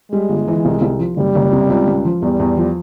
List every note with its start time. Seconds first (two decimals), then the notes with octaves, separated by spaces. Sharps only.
0.11 G3 G#3
0.29 G1
0.48 E3
0.65 C2
0.82 C2
0.99 F3
1.17 F#1 G3
1.35 F#1
1.52 C3
1.70 C#2
1.88 C#2
2.05 F3
2.22 E2 G3
2.40 E2
2.57 F3